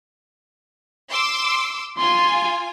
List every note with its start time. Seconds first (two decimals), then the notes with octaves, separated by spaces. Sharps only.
1.09 C6 D6 E6
1.98 F4 G#5 C6